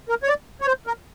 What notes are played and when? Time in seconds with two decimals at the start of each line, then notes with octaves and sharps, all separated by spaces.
0.09 A#4
0.23 C#5
0.28 D5
0.61 C#5
0.67 C5
0.87 A#4